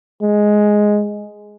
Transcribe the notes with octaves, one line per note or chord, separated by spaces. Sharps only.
G#3